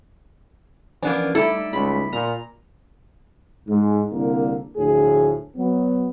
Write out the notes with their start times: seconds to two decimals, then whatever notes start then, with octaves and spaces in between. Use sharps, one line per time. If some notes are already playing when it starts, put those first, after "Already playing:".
1.03 E3 F3 A#3 B3 C#4 D4
1.35 G3 A3 D#4 E4 G4 A4
1.73 C#2 B5
2.13 A#2 A#5
3.68 G#2 G#3
4.12 C2 D3 A#3
4.77 D2 A2 F3 G#4
5.56 F#3 B3